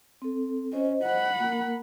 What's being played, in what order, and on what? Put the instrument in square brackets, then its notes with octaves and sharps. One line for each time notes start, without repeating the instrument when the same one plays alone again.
[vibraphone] C4 A4
[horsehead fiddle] C#4 [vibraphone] C5 D#5
[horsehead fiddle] F#5 B5
[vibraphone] A#3 A#4